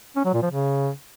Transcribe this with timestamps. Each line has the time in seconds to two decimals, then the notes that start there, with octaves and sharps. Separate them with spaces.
0.16 C#4
0.25 F#3
0.34 A#2
0.42 F3
0.51 C#3